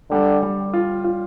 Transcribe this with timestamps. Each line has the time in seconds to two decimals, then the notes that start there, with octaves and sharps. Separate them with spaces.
0.11 D3 G3
0.43 G3
0.74 F4
1.04 F4